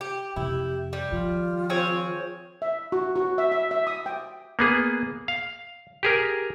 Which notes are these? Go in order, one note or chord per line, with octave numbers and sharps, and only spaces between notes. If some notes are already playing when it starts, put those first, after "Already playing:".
G4
F2 C3 E4 G4
G3
D#3 F3 F4
C4 G#4 C#5
E5
F#4
F#4
E5
E5
E5
D#6
G5
A#3 B3 G#4
F5
G4 G#4 A#4